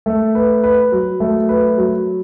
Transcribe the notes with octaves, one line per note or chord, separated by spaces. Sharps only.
A3
B4
B4
F#3
A3
B4
F#3